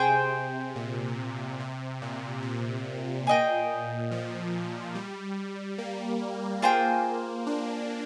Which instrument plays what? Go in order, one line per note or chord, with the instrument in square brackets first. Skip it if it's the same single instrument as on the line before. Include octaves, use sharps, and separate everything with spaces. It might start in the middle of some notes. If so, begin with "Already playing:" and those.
Already playing: [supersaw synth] C3 [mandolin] G#4 C5 G5
[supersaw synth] A#2
C3
A#2
C3
[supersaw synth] A#2 [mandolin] G#4 D#5 G5
[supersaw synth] F3
G3
A#3
[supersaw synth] A#3 [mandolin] F4 G#4 C5 G5
[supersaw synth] D4